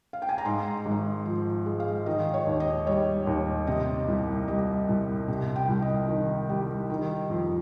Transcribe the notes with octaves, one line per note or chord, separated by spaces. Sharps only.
F5
G5
G#5
A#5
G#2 C6
G#1
F3
G#3
F5
D#3 D#5
C#5
D#2
D#5
G3 C#5
D#2
C3 D#5
C2
G3 D#5
C2
C3
G5
C2
D#5
D#3
G3
D#3
F2